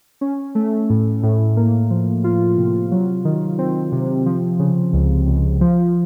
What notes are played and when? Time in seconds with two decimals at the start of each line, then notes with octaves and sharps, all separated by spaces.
0.21 C#4
0.55 A3
0.90 A2
1.23 A2
1.57 A#3
1.90 F3
2.24 F4
2.57 C3
2.91 F#3
3.25 D#3
3.59 C4
3.92 C3
4.26 F3
4.59 C#3
4.93 C#2
5.27 C#2
5.61 F3